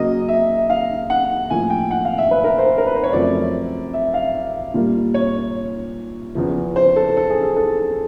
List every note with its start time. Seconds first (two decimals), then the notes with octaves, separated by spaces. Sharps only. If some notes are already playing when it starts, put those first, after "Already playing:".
Already playing: C#3 F#3 A#3 D#5
0.28 E5
0.70 F5
1.10 F#5
1.50 A2 F3 A#3 G#5
1.70 G5
1.91 F#5
2.05 F5
2.18 E5
2.31 B4
2.44 A#4
2.58 C5
2.78 A#4
2.87 B4
2.96 C5
3.03 C#5
3.12 F#2 C#3 F3 A3 C4 D5
3.94 E5
4.14 F5
4.74 A#2 G3 A#3
5.14 C#5
6.35 E2 C#3 F3
6.76 C5
6.96 A4
7.17 A4
7.30 G#4
7.43 A4
7.56 A4